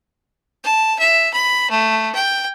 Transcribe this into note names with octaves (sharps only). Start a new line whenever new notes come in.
A5
E5
B5
A3
G5